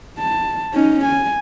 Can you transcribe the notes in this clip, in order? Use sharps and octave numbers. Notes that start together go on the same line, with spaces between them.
A5
C#4 D#4
G#5